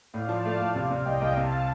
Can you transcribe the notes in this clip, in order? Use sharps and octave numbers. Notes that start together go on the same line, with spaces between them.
A2 D5 F5
F3 F5 A5
A3 D5 F5
A2
C3
C3
C2 D#5 G5
C2
G5
C3 F5 A5